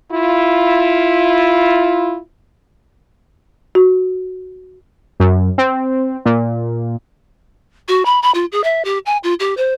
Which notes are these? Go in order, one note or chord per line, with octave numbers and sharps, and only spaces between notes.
E4 F4
F#4
F#2
C4
A#2
F#4
B5
B5
F4
G#4
E5
G4
G#5
F4
G4
C5